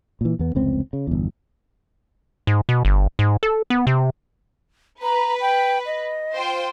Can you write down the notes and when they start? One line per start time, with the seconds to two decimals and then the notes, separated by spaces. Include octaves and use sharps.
0.21 A#2 E3
0.39 E2 B3
0.55 F1 C#2 C4
0.93 C#3
1.07 G1 E2
2.47 G#2
2.69 B2
2.85 G1
3.19 G#2
3.43 A4
3.70 B3
3.87 C3
5.03 B4 A#5
5.41 G5
5.86 D#5
6.35 F4 C5 G5